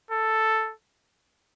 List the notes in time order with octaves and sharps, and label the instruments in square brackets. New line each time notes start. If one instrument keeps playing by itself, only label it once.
[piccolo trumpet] A4